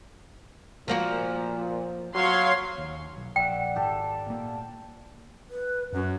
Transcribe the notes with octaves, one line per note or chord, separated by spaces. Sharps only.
A#2 F3 A#3 F#4
F#3 C#5 F5 C6
D#2
B1
A#1 D5 E5 F#5 G5
G#1 G4 A4
A#2 A#3
B4
F#2 C#4